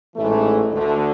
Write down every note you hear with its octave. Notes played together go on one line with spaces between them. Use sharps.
A1 G#2 E3 A3
D2 D3 A3